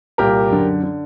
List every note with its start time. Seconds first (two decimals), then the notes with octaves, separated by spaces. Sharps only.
0.18 C2 A#2 G4 A#4
0.51 F#2 D3
0.83 D3